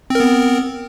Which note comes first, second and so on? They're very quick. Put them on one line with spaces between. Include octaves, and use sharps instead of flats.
C4 A#4 B3